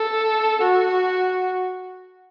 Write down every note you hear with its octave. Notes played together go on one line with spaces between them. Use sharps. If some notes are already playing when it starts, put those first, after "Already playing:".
Already playing: A4
F#4